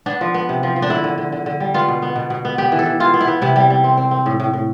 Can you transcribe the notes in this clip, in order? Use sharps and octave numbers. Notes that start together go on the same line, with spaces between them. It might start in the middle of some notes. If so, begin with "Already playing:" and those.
B3 D4
F3
B3
C3
F3
F3
D4
D3 E4
D3
D3
D3
D3
G3
B3 F4
B2
B3
B2
B2
B3
B3 G4
E3
A4
E3
E3 F4
B3
E4
B3
C3 E4
G3
G3
C4
C4
C4
A2
A2
A2